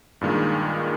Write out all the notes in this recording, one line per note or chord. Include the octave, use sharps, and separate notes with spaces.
G2 A#2 D#3 G#3